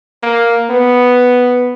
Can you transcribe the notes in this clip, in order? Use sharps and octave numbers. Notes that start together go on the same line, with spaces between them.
A#3
B3